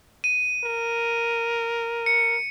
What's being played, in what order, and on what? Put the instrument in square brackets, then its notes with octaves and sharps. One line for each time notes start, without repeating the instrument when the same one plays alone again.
[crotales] D#7
[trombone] A#4
[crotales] C#7